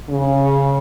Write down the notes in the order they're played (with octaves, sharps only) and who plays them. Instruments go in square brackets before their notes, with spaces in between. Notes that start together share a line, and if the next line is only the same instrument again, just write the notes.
[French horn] C#3